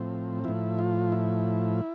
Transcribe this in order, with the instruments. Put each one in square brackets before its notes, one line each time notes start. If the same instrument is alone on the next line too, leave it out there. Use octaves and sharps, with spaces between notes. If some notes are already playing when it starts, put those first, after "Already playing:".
Already playing: [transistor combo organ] A2 F3 C4
A2 F3 E4
F4
E4